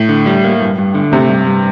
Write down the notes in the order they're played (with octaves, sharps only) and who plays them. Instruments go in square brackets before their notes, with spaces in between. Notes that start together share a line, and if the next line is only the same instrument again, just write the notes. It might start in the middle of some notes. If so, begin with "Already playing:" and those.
Already playing: [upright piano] A2
[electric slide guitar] D3
G3
A#3
G2
G2
D3
[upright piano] C3 [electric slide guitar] A3
[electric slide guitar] G2
G2